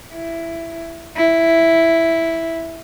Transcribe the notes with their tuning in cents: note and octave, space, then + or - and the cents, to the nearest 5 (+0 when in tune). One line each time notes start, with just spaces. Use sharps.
E4 +10
E4 +0